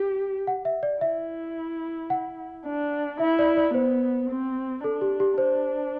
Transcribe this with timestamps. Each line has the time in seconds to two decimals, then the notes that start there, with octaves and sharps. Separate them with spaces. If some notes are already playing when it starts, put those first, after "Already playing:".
Already playing: G4
0.47 F#5
0.65 E5
0.83 D5
1.01 E4 E5
2.10 F#5
2.65 D4
3.20 E4 E5
3.39 D5
3.57 D5
3.74 B3 C5
4.29 C4
4.83 D4 A4
5.01 G4
5.20 G4
5.38 D4 C5